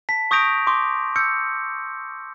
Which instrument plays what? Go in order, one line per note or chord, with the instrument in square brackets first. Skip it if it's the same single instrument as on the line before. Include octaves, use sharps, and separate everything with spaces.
[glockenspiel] A5 B6
C#6 D#6 G6 A#6 D7 F7
C6 D6
E6 G6 C#7